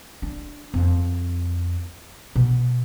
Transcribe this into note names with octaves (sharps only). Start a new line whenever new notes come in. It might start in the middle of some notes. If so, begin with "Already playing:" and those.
D4
F2
B2